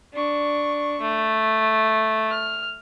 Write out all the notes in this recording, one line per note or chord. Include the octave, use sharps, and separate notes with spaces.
D4 C#6
A3
F6